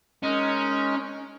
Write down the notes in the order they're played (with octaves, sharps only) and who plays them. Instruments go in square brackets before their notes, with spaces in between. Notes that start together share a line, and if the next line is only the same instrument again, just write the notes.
[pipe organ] G#3 D#4 A#4 D#5 [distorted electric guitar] C#4